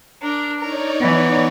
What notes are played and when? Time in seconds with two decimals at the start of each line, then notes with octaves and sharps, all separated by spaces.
0.22 D4 A#4
0.60 D#4 A#4 C#5 D5
1.00 E3 B3